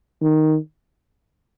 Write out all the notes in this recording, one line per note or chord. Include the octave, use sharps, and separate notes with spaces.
D#3